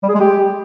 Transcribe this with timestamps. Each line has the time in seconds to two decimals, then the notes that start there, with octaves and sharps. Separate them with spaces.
0.03 G3
0.09 G#4
0.15 G#3
0.20 G4